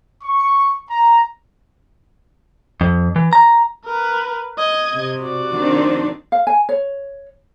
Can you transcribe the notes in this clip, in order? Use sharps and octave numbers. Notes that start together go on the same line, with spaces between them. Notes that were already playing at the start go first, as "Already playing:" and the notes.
C#6
A#5
F2
E3
A#5
A#4 B4
D#5 G#6
C3
F#4 D5
D#3 C4 D4
F5
G#5
C#5